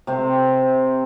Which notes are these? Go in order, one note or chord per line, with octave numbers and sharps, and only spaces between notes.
C3 C4